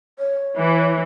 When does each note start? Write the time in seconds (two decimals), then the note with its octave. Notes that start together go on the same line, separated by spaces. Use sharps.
0.19 C#5
0.56 E3